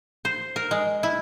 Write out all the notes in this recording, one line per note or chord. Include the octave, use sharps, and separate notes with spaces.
C5
A#4
G#3
E4